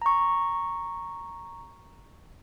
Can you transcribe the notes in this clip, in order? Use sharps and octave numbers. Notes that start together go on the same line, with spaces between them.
A#5 C#6